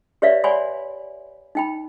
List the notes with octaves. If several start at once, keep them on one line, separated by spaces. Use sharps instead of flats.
G4 B4 C#5 D5 E5 F5
C#5 D5 F#5 G#5 B5 C6
D#4 G5 B5